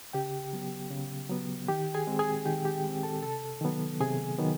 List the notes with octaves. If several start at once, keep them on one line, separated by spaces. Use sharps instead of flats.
C#3 G4 G5
F#3 B3
C#3
F#3 B3
D#3 G4 G5
G#4 G#5
G#3 C4
G#4 G#5
D#3 G4 G5
G4 G5
G#3 C4
A4 A5
C3 A4 A5
D#3 F#3 B3
C3 G#4 G#5
D#3 F#3 B3